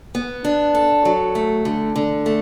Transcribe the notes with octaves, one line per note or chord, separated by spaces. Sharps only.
B3
D4
A4
F#3
A3
D3
D3
A3